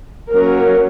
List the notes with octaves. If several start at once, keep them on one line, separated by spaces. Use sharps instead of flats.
F#3 A#3 C#4 A#4